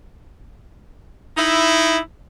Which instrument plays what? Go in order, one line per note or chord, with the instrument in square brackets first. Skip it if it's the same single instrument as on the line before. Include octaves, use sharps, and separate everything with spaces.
[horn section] D#4 E4